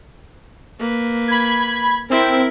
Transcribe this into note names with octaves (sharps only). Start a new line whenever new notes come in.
A#3 B4
B5 G#6
C4 E4 A#4